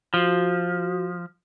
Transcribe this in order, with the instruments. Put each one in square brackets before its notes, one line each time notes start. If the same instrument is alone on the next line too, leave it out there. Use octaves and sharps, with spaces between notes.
[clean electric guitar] F3 [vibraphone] F#4